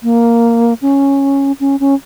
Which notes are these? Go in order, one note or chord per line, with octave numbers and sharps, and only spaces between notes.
A#3
C#4
C#4
C#4